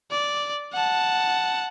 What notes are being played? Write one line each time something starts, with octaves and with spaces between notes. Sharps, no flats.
D5
F#5 A5